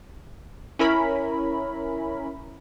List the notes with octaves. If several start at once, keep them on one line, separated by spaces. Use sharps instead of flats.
C#4 E4 A#4 B5